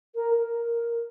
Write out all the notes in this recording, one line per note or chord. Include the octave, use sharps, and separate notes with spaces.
A#4
A#4